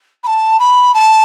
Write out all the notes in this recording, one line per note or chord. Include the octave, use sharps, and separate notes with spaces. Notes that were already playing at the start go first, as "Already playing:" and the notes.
B5
A5
B5
A5